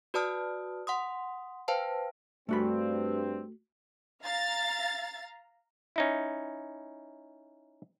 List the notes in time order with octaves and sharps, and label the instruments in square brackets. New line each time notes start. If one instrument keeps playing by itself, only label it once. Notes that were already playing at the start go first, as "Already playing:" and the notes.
[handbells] F#4 B4 D5 A5 D#6 F6
F#5 C6 D#6
B4 C5 F5 G5 A5
[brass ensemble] G2 C4 [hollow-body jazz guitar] A3 F#4 B5
[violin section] F5 A#5 A6
[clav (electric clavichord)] C#4 D#4 E4